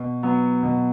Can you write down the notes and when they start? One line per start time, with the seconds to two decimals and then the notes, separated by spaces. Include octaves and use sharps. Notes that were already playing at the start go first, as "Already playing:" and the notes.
Already playing: B2
0.23 F#3 B3
0.63 B2